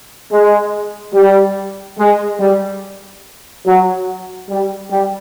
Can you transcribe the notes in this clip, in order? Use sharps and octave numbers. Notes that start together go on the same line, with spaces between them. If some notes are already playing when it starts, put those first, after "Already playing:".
G#3
G3
G#3
G3
F#3
G3
G3